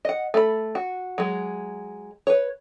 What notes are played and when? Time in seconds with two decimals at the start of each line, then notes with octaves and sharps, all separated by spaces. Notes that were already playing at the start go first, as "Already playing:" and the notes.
0.05 D#5 F#5
0.34 A3 B5
0.75 F#4
1.18 F#3 G#3
2.27 B4 C#5